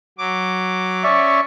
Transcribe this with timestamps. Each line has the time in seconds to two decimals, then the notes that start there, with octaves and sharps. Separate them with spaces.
0.18 F#3 D6
1.04 C#4 D5 E5 C#6